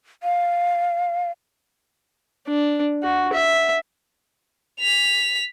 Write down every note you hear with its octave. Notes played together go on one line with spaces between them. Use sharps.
F5
D4
F#4
E5
B6 F7